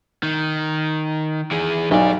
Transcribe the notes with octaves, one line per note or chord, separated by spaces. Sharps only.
D#3
E3 G#4
B1 G4 D5